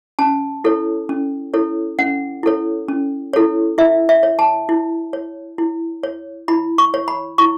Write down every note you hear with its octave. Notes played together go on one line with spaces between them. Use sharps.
C#4 A5
E4 A4 C#5
C#4
E4 A4 C#5
C#4 F#5
E4 A4 C#5
C#4
E4 A4 C#5
E4 E5
E5
C#5
A5
E4
C#5
E4
C#5
E4 B5
C#6
C#5
B5
E4 C#6